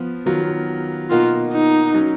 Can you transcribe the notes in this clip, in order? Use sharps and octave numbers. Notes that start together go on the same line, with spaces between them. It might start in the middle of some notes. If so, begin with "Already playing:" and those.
Already playing: F3 B3 F4
D#3 F#3 B3 F4
B2 A#3 D#4 F4 F#4
D#4
F#3 C#4 F#4